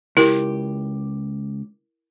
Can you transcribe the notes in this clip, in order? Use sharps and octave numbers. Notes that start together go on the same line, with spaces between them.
C#2 E4 G4 A#4